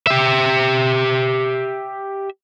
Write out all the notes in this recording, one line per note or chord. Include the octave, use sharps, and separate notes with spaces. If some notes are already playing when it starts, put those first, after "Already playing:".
G4 E5